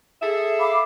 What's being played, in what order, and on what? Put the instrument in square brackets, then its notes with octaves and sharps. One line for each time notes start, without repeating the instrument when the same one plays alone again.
[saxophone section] G#4 A4 E5
[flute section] F5 B5 D6